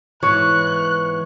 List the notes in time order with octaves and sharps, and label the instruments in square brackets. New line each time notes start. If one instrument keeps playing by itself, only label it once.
[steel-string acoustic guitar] G#2 B2 E3 [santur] C#5 [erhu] F#6